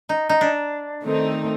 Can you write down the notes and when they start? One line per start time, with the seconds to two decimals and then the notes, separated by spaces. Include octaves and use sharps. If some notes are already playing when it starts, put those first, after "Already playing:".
0.09 D#4
0.29 D#4
0.41 D4
1.04 D#3 A3 C4 D#4